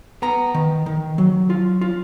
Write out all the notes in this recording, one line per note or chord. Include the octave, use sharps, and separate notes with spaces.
B3 A#5
D#3
D#3
F#3
F4
F4